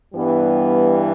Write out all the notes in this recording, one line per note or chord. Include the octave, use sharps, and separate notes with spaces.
G2 E3 G3 B3